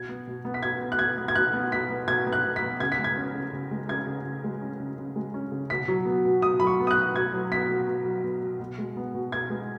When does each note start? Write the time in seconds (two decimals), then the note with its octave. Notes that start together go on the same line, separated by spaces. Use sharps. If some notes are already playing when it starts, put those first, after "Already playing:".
Already playing: B2 G#6
0.09 B3
0.27 B2
0.45 B3
0.54 B6
0.63 B2 G#6
0.81 B3
0.92 F#6
0.99 B2 G#6
1.18 B3
1.28 G#6
1.35 B2 F#6
1.53 B3
1.71 B2 B6
1.90 B3
2.08 B2 G#6
2.27 B3
2.33 F#6
2.44 B2
2.56 B6
2.62 B3
2.80 C#3 G#6
2.92 B6
2.98 G#3
3.04 G#6
3.16 C#4
3.35 C#3
3.53 C#3
3.71 G#3
3.89 C#4 G#6
4.07 C#3
4.25 C#3
4.44 G#3
4.61 C#4
4.80 C#3
4.98 C#3
5.16 G#3
5.34 C#4
5.52 C#3
5.70 B2 B6
5.88 F#3
6.06 B3
6.25 B2
6.42 B2 D#6
6.60 F#3 B5
6.67 C#6
6.79 B3
6.87 D#6
6.91 F#6
6.97 B2
7.14 B2 G#6
7.33 F#3
7.51 B3 B6
7.69 B2
7.88 B2
8.05 F#3
8.24 B3
8.42 B2
8.60 B2
8.78 G#3
8.97 B3
9.14 B2
9.32 B2 G#6
9.50 G#3